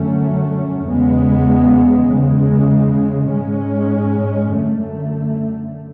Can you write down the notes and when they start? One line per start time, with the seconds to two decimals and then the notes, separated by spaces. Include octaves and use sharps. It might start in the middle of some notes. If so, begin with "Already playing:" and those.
Already playing: F#2 D3 F#3 A3 C#4
0.86 E2 C#3 G#3 B3
2.09 E2 C#3 G#3
3.32 G#2 G#3 C#4
4.54 F#2 D3 A3